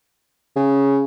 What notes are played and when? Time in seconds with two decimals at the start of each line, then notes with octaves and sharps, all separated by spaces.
0.56 C#3